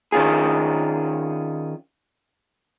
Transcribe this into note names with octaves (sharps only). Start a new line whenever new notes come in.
D#3 C#4 F4 G#4